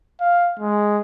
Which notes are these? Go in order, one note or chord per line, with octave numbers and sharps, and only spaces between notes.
F5
G#3